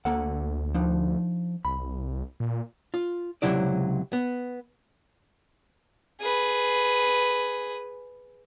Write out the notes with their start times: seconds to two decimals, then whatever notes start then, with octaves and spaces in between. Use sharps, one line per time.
0.05 D2 A#3 A4 F#5
0.74 F3 D4 D#4
1.65 C2 B5
2.40 A#2
2.94 F4
3.42 C#2 F#2 C3 F#3 E4 D5
4.13 B3
6.21 G#4 B4